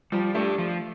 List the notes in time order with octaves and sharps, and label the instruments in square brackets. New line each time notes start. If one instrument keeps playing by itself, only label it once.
[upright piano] F3 [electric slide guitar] G3
[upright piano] A3 [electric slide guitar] D4 G4
[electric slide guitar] F3